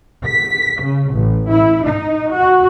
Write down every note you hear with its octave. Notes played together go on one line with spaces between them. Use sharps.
B6
C#3
A1
E4
D#4
F#4